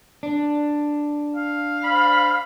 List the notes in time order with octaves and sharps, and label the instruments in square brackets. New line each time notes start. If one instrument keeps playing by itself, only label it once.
[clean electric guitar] D4
[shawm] F5
[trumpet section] C5 D5 B5